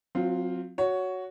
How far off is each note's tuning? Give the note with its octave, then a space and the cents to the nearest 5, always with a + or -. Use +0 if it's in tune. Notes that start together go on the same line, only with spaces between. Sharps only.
F#3 -25 C4 +0 F4 +0
F#4 +0 C#5 +10